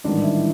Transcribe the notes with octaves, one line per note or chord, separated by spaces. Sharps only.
A1 G#2 D#3 G3 D4
E4